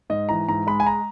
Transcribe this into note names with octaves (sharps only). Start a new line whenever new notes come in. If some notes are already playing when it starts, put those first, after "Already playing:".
G#2 D#5
E3 A#5
G#2 A#5
G#3 B5
G#5
A#5